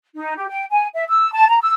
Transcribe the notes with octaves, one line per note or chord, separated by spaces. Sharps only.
D#4
G4
G5
G#5
E5
E6
A5
A#5
E6